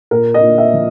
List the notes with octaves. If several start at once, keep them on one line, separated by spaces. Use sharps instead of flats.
A#2 A#4
D#5
A#2
E5
F3